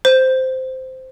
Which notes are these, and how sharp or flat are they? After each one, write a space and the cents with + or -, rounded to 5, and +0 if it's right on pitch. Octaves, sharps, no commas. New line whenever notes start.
C5 -10